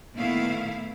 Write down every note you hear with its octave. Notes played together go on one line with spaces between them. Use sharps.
A#2 D#3 A3 B3 E4 F5